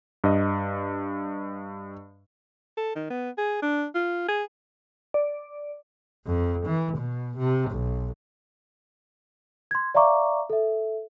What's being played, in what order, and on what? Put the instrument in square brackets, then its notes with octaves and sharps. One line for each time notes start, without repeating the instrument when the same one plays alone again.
[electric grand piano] G2 D#5
[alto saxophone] A4
D#3
B3
G#4
D4
F4
G#4
[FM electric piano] D5
[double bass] F2
E3
B2
C3
B1
[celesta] C6 G#6
D5 E5 F5 A#5 C#6 D6
A4 E5